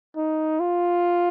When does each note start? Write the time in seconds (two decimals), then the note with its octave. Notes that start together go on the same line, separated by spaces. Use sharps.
0.17 D#4
0.60 F4